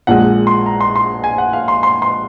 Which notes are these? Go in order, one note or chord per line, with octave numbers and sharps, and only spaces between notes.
A#1 A#2 G#3 F#5
C6
A#5
C6
C6
G#5
F#5
F5
C6
C6
C6